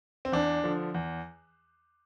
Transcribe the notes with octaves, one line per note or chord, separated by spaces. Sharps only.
C4
E2 D4
D3 F3
E2